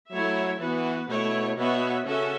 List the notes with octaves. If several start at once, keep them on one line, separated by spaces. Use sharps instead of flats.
F#3 A3 E4 C#5 E5
E3 B3 F#4 B4
B2 A3 E4 C#5
B2 B3 F#4 C#5 E5
C#3 C#4 F#4 A4 E5